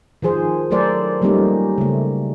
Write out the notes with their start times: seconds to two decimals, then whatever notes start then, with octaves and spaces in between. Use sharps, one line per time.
0.22 D#3 F3 G#4 C5
0.71 F#3 A3 A4 A#4 C5 D5
1.22 F3 G3 A3 A#3 C#4 D#4
1.78 C#3 A3